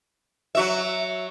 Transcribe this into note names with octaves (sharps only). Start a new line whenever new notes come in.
F#3 F#4 E5